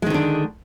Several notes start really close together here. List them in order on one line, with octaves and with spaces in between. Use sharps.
G#3 D#3 D3 D4